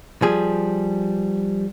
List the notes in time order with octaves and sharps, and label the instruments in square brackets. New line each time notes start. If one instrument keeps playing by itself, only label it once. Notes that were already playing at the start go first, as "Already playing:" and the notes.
[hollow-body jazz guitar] F3 G3 G#4